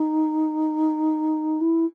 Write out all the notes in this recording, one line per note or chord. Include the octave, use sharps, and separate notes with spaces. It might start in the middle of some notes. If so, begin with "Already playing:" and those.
Already playing: D#4
E4